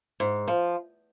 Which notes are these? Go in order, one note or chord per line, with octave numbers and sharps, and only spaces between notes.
G#2
F3